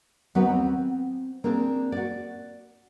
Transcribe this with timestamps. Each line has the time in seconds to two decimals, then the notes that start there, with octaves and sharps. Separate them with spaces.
0.35 D#2 F#3 B3 C#4 F#4 B4
0.50 C4
1.44 A#3 C4 D4 G#4
1.92 F#4 D5